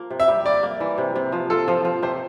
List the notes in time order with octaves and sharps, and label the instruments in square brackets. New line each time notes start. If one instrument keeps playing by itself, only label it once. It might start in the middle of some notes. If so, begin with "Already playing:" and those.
Already playing: [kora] F3 A#3 F4
C3
[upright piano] E5
[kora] G3
[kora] A#3 [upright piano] D5
[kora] A#3
E3
C3
C3
F3
[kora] F4 [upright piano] A4
[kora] F3
F3
[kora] C3 [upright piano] C5